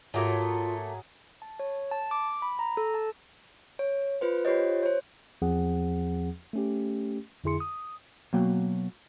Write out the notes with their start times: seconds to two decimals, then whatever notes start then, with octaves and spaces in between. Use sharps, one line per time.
0.14 G#2 F#3 A3 A#3 F4 G#4
1.42 A5
1.60 C#5
1.91 A5
2.11 D6
2.42 B5
2.59 A#5
2.77 A4
2.94 A5
3.79 C#5
4.21 F4 B4 C5
4.45 F4 G4 C5 C#5 D#5
4.83 C5 C#5
5.42 E2 F3 C4 G#4 F#5
6.53 A3 C#4 G4
7.44 F2 D3 E4 G#4 C6 C#7
7.60 D#6
8.33 B2 F#3 A#3 G5